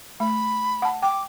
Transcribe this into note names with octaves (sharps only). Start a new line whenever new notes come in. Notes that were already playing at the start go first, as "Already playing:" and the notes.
A3 B5
F#5 A5
G5 D6